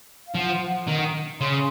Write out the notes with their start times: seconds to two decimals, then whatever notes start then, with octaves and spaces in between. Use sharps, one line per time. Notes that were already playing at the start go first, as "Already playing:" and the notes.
0.26 F5
0.35 F3 F#5
0.88 D#3
1.40 C#3 C6